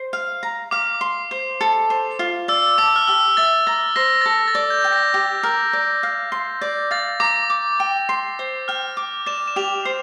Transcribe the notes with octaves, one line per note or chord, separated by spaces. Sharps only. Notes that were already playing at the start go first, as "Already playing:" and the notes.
Already playing: C5
F5
A#5
F5 D6
C6
C5
A4
C5
F4
D5 E6
A5 D6
F6
G4 E6
E5 A6
A#5 A6
C5 A#6
A6
A4 A#6
A6
D5
G6
G5
A#6
G4
A#4
D5
F5
C6
D5
F5 A6
A#5 D6
D6
G5
C6
C5
G5 F6
D6
D5 E7
E7
G4 F7
C5